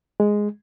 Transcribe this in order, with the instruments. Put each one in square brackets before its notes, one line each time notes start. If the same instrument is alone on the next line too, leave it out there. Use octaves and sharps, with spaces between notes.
[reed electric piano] G#3